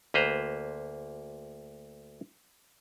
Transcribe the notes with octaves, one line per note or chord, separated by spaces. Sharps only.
D2 A#3 B4 C5 A#5